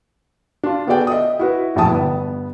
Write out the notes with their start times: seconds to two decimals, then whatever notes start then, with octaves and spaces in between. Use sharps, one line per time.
0.63 D4 F4
0.87 B3 F#4 G#4 A4 D5 G5
1.07 D#5 E5 D#6
1.39 E4 F#4 B4
1.75 E1 A#1 A2 E4 A5 D#6
1.89 G1 B3